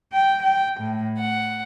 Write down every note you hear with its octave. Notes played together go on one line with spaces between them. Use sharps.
G5
G5
A2
F#5